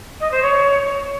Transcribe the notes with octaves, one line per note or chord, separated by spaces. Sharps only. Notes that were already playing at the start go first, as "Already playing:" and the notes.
D#5
C5
C#5